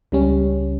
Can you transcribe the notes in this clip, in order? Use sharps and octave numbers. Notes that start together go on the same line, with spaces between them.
C#2 C#3 G3 C#4